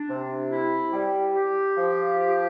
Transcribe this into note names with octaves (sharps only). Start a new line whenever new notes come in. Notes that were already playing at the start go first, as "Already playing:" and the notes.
Already playing: D4
C3
E4
G3
G4
F3
G4